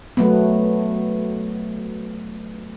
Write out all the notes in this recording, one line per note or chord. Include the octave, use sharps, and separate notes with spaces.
F#3 A3 B3